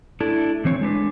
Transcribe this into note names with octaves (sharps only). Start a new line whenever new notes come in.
A3 D4 E4 A4
D3 E3 C4 C#5
G#3 D4 B4